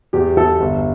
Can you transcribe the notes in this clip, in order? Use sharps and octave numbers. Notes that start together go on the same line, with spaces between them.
E2 G4
E2 A4
G1